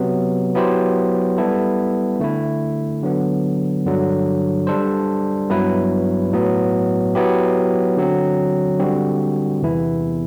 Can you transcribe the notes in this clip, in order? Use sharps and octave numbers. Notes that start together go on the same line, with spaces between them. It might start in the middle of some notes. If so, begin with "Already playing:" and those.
Already playing: C3 F#3 B3
F#3 B3 E4 G4 C5
G3 B3 E4 A4
D3 A3 E4
D3 F#3 B3
G2 D3 F#3
G3 D4 A4 C5
G2 F#3 B3 E4 B4
A2 F#3 B3
F#3 B3 E4 G4
D3 F#3 C4
D3 G3 C4 F#4
E2 C3 E3 B3 E4